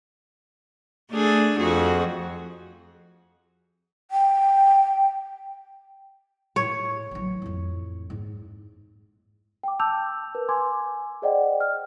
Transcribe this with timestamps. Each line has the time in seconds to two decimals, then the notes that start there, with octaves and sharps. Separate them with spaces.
1.11 A3 D4 G#4
1.59 F2 F#4 G#4
4.11 G5
6.56 A2 C#5
7.11 A1 F#3
7.42 A1 F2
8.10 G#2
9.63 G5 D6
9.79 A5 D6 E6 G6 F7
10.35 A#4 B4
10.49 G#5 C6 D6 G#6
11.22 G#4 C5 D5 D#5 F#5 G5
11.60 F6